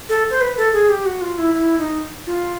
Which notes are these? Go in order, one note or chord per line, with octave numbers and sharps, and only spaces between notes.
A4
C5
B4
A4
G#4
G4
F#4
F4
E4
E4
D#4
F4